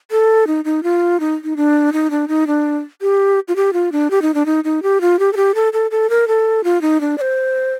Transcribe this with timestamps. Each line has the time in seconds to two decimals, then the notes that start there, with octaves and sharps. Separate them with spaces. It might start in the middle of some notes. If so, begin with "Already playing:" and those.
0.11 A4
0.47 D#4
0.65 D#4
0.83 F4
1.20 D#4
1.44 D#4
1.57 D4
1.93 D#4
2.11 D4
2.28 D#4
2.47 D4
3.02 G4
3.48 F4
3.56 G4
3.73 F4
3.92 D4
4.11 G4
4.22 D#4
4.34 D4
4.46 D#4
4.64 D#4
4.83 G4
5.01 F4
5.19 G4
5.33 A4
5.37 G4
5.55 A4
5.73 A4
5.91 A4
6.10 A#4
6.28 A4
6.64 F4
6.82 D#4
7.01 D4
7.18 D5
7.21 C5